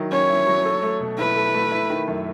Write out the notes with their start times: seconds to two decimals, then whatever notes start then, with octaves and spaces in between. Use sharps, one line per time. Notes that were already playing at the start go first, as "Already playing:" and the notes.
Already playing: D#3 F#3 E4
0.12 C#4 C#5
0.30 E4
0.47 F#3
0.65 A4
0.83 A3
1.00 B2
1.19 E4 B4
1.36 A4
1.54 A3
1.72 E4
1.90 D#3
2.08 F#2